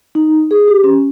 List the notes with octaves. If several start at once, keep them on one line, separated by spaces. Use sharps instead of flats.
D#4
G#4
G4
C#4